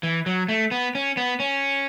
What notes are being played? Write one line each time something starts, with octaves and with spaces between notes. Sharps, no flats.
E3
F#3
A3
B3
C#4
B3
C#4